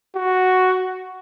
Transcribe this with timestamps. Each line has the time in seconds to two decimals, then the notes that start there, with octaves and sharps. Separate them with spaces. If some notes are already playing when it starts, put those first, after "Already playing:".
0.15 F#4